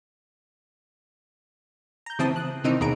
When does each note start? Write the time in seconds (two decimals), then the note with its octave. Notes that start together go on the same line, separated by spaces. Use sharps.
2.06 A#5 G6
2.19 C#3 E3 C4 E4 A5 D#6
2.36 F#6
2.64 C3 D#3 E3 C4 D#4
2.80 D#2 B2 G#4 A#5 D7